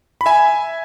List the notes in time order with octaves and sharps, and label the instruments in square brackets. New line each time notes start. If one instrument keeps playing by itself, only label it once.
[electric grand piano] B5
E5 G#5